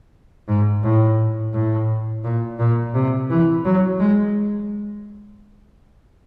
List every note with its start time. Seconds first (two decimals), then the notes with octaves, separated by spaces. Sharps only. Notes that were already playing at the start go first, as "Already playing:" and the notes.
0.49 G#2
0.83 A2
1.53 A2
2.24 A#2
2.59 A#2
2.94 C3
3.30 E3
3.65 F#3
3.99 G#3